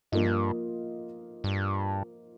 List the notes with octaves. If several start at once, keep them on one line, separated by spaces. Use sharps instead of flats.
G2 F3 A#3 F4 D#5
G2